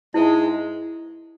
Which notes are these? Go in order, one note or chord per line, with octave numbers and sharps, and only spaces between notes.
G#2 G#3 E4 B4 E5